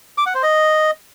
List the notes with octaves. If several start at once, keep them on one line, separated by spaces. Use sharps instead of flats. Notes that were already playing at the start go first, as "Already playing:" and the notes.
D6
F#5
C5
D#5